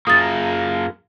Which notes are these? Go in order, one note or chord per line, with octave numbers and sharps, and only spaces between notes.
F#2 A#3 F4 G#4 A#5 D#6 A6